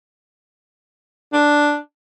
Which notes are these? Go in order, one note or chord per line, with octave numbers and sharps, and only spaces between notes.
D4